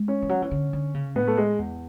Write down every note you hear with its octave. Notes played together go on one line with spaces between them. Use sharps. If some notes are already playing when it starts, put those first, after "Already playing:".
Already playing: G#3
C#4
E3
F#3
E3
D3
D3
C#3
A2 B3
A3
G#3
E2